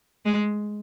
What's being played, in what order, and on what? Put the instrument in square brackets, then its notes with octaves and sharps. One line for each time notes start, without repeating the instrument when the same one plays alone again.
[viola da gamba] G#3